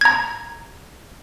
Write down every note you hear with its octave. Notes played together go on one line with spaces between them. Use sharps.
A#5 G#6